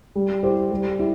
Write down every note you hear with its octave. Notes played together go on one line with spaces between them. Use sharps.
G3
E4 G4 C5
G3
E4 G4